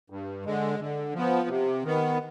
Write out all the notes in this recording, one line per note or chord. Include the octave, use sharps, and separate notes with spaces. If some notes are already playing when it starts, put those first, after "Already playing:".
G2
D3 G#3
D3
F3 B3
C3
D#3 B3